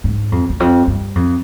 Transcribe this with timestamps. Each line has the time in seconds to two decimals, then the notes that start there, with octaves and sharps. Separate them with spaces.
0.04 G#2
0.32 F2
0.50 E2
0.60 F2
0.87 G2
1.15 F2